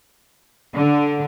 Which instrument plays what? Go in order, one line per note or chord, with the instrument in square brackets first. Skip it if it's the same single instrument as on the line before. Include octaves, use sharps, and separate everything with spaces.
[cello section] D3